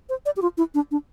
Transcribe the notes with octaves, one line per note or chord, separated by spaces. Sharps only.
C5
D5
G4
F4
E4
D4
D4